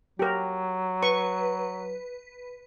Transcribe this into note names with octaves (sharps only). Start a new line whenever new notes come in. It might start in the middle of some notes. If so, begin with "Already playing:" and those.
F#3 G4 A#4
B4 C#6